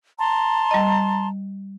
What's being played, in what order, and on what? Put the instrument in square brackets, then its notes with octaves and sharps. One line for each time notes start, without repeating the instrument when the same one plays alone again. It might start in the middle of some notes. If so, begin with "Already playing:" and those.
[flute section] A5 A#5 C6
[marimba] G3 D#5